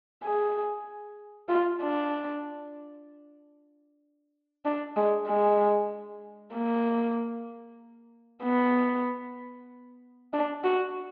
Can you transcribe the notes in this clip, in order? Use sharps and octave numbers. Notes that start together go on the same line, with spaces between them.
G#4
F4
D4
D4
G#3
G#3
A#3
B3
D4
F#4